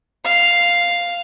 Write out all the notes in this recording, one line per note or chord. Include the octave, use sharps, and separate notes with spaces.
F5